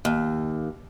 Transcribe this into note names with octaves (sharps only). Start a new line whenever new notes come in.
D#2